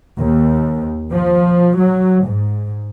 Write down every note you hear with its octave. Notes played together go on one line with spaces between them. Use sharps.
D#2
F3
F#3
G#2